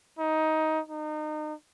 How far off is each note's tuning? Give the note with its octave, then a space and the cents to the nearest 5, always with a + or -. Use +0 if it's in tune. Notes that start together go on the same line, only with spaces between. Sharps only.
D#4 +15
D#4 -30